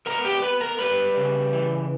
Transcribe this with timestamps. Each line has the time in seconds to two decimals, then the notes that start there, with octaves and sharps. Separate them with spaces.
0.06 B3 A#4 A#5
0.25 G4 G5
0.42 B3 B4 B5
0.61 A#4 A#5
0.79 G3 B4 B5
1.16 C#3
1.53 E3